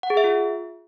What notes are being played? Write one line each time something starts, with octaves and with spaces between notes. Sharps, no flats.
F#5
G#4
E5
F4